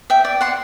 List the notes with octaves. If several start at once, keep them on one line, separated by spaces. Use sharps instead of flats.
E5 G5
D5
F#5 C6